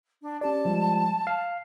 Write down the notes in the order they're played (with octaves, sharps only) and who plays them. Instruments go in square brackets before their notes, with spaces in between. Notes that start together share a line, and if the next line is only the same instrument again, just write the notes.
[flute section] D4
[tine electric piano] C#4 G4 D5 [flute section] A5
[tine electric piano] F3 G3 G#3
F5